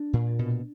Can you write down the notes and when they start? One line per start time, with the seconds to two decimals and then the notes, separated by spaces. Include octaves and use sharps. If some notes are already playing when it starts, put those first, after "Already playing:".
Already playing: D4
0.13 A#2
0.39 B2